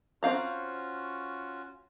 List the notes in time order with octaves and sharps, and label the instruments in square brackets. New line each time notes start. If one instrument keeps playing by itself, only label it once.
[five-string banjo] C4 F5 A#5 [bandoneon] C#4 F4 F#4